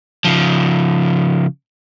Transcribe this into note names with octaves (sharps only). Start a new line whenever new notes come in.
C#3 F3